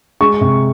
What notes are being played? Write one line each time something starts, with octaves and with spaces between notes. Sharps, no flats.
G#3 C#6
C3